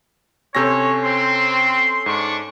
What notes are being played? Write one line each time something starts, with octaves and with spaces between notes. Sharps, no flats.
C3 C#4 A4 C5 C#5 A#6
C4 C6
G#2 D4 C#6